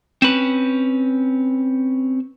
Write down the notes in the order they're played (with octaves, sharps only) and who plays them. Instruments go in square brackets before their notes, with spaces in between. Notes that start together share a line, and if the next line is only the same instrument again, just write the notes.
[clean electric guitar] C4 C#4 B4